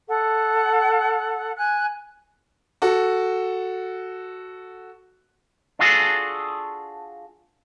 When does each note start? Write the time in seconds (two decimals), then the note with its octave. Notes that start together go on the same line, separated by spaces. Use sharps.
0.08 A4 F#5
1.57 G#5 F#6
2.82 F#4 A4
5.79 D4 F4 F#4 G#4 A4